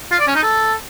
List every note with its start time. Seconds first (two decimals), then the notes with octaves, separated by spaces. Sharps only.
0.12 F4
0.20 D5
0.28 C#4
0.35 D#4
0.43 A4